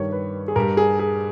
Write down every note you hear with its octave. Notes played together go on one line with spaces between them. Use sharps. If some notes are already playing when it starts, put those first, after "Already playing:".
Already playing: G2 D#3 G3 C#5
B4
G#4
G2 G3 A#4
G#4
G#4